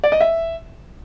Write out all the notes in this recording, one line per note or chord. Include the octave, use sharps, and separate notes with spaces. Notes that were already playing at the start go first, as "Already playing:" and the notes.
D5
D#5
E5